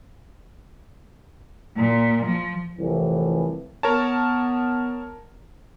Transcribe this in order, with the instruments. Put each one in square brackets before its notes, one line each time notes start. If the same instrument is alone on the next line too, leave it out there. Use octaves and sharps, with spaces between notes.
[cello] A#2
F3
[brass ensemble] C2 F2 A2 E3
[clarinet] B3 [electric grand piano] A#4 C#5 A5